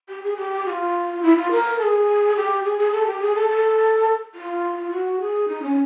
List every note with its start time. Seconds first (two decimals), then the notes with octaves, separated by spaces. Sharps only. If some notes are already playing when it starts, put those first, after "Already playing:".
0.09 G4
0.23 G#4
0.37 G4
0.66 F#4
0.70 F4
1.23 E4
1.37 F4
1.51 A#4
1.79 A4
1.83 G#4
2.36 G4
2.64 G#4
2.78 G#4
2.92 A4
3.07 G4
3.21 G#4
3.35 A4
3.49 A4
4.35 F4
4.91 F#4
5.20 G#4
5.48 D#4
5.62 C#4